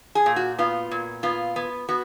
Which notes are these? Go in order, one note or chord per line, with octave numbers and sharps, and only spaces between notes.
G#4
A#2
F#4
B3 F4
A#2
B3 F4
B3
B3 F#4